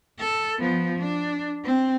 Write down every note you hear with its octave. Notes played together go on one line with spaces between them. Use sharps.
A4
F3 B3
D4
C4